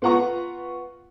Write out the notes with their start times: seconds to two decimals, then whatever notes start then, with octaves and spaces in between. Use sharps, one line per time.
0.02 B3 F4 F#5 A#5 C#6